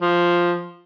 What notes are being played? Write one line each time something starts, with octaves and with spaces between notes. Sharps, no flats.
F3